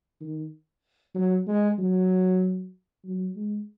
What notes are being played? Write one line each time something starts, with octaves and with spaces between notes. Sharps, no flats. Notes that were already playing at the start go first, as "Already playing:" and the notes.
D#3
F#3
G#3
F#3
F#3
G#3